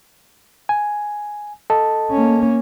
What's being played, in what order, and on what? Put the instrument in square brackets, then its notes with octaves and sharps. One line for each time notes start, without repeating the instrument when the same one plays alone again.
[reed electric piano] G#5
A4 D#5 A5
[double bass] A#3 C#4